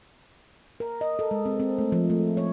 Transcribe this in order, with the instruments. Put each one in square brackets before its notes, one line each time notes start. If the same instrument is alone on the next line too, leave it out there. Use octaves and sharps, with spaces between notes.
[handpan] A#4
D#5
A4
G#3
C4
C4
A3
F3
A3
C#5